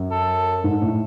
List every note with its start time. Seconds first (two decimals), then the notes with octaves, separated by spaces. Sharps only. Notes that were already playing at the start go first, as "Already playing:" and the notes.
Already playing: F#2
0.12 A4
0.64 G#2
0.82 A2